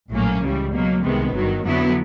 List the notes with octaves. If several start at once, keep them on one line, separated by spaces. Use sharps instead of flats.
A#1 A2 F#3 A#3 C#4
C#2 C#3 E3 G3
B2 F#3 A#3
C2 C3 D#3 G#3 B3
G1 G2 D#3 F#3
F2 D3 F#3 B3 E4